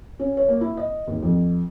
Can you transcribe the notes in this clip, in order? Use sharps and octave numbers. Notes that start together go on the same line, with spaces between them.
C#4
C#5
A#3
E4
D#5
D#2
F2